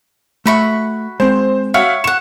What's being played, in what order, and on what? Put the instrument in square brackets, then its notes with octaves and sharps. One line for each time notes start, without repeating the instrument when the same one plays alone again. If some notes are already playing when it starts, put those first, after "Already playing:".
[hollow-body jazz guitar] A3 E5 [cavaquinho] F#4 B5 C#6
[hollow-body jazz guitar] G#3 C4 [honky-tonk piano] C5
[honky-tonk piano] F#4 E5 F5 [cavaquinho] C#5
[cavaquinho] F#5 C#6 [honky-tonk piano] E7